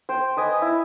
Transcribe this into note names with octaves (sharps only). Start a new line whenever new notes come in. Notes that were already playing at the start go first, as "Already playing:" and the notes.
C5 G5
B4 D#5 G#5 D6
E4